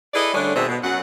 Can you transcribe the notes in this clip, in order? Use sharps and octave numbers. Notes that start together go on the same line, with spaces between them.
E4 G#4 A4 B4 D5 D#5
D3 G3 A3 C#4 D4
B2 D#3 C4 D4 G#4 E5
B2
F#2 F#5